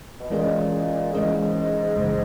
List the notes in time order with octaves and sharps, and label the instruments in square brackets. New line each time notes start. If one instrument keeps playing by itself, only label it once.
[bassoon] B2
[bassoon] A#2 [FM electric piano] E3 G#3 C#4 G#4 D#5
[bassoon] G#2 [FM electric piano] E3 G#3 C#4 G#4 D#5
[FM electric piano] G#1 F#2 C#3 E3 G#3